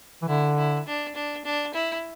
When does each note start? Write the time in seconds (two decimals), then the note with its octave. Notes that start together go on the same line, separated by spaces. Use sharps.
0.22 E3
0.28 D3 E4
0.57 E4
0.87 D4
1.15 D4
1.45 D4
1.74 E4